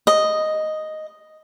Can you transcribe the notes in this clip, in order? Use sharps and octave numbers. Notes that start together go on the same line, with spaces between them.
D#5